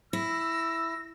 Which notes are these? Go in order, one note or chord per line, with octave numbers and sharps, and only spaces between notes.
E4 E6 A#6